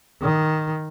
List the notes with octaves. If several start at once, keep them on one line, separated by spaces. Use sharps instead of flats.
D#3